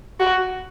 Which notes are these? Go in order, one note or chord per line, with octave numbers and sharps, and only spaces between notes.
F#4